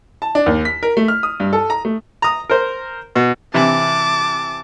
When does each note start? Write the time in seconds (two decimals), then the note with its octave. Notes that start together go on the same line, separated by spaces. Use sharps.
0.22 A5
0.35 D4
0.46 D#2
0.65 B6
0.83 A#4
0.97 A3
1.08 F6
1.23 D#6
1.40 G2
1.53 A4
1.70 A#5
1.85 A3
2.22 A#5 D#6
2.50 A#4 C5
3.16 B2
3.54 C3 E3 E4 A5 D6